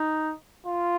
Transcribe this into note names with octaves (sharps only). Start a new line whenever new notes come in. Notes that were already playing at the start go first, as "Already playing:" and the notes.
Already playing: D#4
F4